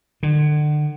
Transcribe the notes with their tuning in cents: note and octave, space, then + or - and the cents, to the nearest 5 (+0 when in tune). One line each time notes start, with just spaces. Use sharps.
D3 +35